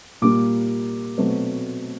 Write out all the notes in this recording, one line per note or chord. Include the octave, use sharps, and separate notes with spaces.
A#2 G3 A#3 D6
B2 F#3 A3 C4